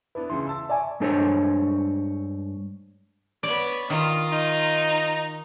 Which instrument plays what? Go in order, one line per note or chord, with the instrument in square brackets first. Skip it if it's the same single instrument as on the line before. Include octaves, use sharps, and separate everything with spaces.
[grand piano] B3 D4 E4 [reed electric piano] B4
[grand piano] C#2 C#3 E3 [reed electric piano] C6
[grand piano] E5 A5 E6
[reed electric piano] D5 E5 G#5 [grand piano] A5 C#6 D6
[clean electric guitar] G2 G#3 D4 A4 C5 C#5
[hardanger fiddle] B3 C#5 [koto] D5
[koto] D#3 [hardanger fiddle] F4 A#5
[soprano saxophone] D#4